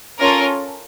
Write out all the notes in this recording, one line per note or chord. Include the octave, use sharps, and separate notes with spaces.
C#4 F4 A4 A#4